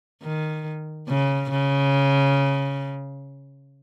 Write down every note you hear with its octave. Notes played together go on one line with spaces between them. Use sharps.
D#3
C#3
C#3